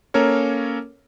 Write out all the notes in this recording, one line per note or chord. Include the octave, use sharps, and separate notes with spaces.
A#3 C#4 A4 A#4 C#5